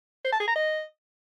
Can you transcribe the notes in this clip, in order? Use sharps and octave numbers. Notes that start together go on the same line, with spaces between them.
C5
A5
G#4
A#5
D#5